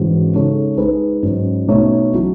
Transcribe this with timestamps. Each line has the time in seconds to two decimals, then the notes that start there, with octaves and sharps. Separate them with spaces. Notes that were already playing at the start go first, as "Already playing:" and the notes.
Already playing: G#2 E3 G#3 C#4 F#4
0.32 C#3 G#3 D#4 A4 C#5
0.77 G#3 D#4 G#4 B4
1.23 G#2 F#3 C#4
1.67 B2 A3 D#4 A4 C#5
2.13 F#3 C#4 E4